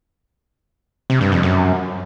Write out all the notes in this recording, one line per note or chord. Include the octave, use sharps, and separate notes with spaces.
C3
G2
F2
F#2